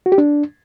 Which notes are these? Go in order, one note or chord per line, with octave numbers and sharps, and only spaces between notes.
F#4
G4
D4